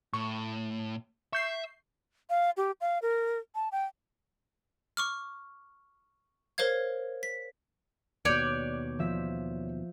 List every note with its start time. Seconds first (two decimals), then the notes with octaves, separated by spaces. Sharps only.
0.13 A2 C#6
1.33 E5 C#6 G6 C7
2.30 F5
2.57 G4
2.81 F5
3.02 A#4
3.55 A5
3.72 G5
4.97 C#6 D6 F6
6.58 A#4 C5 C#5 F5 G#6
7.23 B6
8.25 D#2 B2 C#5 D5 F#6 G6
8.99 F3 E5 B6